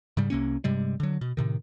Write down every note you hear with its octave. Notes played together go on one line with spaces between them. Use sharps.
G#2 C#3 G3
C2 C3 A#3 C#4
G2 C3 G3 G#3
D3 F#3
B2
A2 C3 D#3